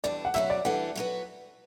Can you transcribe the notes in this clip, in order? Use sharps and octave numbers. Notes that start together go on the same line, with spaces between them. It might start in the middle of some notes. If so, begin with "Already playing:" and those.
E2 B2 G3 D4 A4 D5
F#5
B2 F#3 C#4 F#4 E5
D5
E3 G3 D4 A4 F#5
F#3 B3 F#4 B4